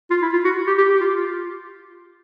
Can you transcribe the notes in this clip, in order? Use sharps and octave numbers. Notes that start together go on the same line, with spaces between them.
F4
E4
F4
F#4
G4
G4
G4
F4
F4